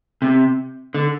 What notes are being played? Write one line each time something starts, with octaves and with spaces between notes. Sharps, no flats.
C3
D3